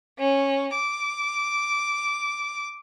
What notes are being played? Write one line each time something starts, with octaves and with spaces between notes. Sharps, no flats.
C#4
D6